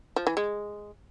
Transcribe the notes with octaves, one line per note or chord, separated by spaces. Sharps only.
F3
E3
G#3